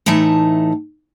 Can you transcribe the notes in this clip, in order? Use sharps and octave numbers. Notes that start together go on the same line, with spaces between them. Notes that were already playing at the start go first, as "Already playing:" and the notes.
A2 E3 A3 D#4 A5